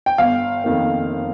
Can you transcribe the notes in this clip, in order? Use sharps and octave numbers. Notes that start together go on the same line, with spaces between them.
G5
G1 F5
F2 D#3 A#3